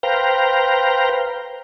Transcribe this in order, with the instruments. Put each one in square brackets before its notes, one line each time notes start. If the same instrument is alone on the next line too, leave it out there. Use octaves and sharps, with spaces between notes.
[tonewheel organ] B4 C5 F5 G5 A#5